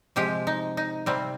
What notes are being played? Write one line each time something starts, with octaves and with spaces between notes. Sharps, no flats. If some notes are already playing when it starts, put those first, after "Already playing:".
C3 F3 G#3 G4
D#4
D#4
C3 G3 C4